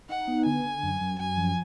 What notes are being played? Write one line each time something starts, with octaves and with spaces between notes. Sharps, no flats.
D#4 F#5
B3
D3 G#5
D3
F#2
F#2
F#2 G#5
F3